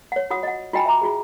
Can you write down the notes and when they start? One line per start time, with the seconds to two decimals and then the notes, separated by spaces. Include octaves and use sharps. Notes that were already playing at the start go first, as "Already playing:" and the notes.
0.12 C#5 F#5
0.30 F4 F#4 F#5 D#6
0.43 D#5 F#5
0.73 F4 F#4 D#5 G5 G#5 B5
0.86 E5 A#5 D6
1.02 F4 F#4 G#4